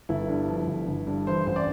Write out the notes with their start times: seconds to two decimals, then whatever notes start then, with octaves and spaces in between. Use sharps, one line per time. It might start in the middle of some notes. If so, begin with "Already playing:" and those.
0.09 G1 E4
0.28 G2
0.48 F3
0.67 G1
0.88 G1
1.07 G2
1.27 E3 C5
1.47 A1 C5
1.56 D5